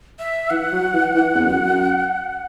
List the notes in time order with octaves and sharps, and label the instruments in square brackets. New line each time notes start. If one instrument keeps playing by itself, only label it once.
[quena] E5
[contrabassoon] E3 [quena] F#5
[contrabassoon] F#3
E3
E3
E2
F#2
F#2